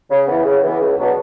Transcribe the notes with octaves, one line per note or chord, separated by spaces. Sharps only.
C#3
E3 B3
C#3
E3 B3
C#2
B2 F#3 B3 D4